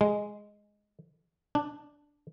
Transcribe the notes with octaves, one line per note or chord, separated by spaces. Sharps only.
G#3
D4